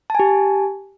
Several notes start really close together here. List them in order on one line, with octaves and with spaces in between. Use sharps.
A5 G#5 G4